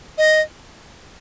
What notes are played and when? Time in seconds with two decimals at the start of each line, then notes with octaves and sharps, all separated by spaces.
0.18 D#5